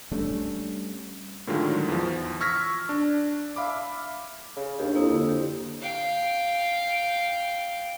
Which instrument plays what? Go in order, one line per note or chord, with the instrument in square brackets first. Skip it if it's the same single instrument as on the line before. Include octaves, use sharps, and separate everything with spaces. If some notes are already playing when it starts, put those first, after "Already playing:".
[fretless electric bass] G3 A3 C#4 D4
[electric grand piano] A2 D3 D#3 F#3 G#3 F4
E2 F3
C#6 E6 F6 G#6 A#6 B6
D4
E5 F5 B5 D6
[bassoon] C#3
[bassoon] D#2 [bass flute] D4 [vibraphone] G4
[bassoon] F2 [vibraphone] A#3 E4 D#6
[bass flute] D3
[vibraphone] G4
[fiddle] F5 G5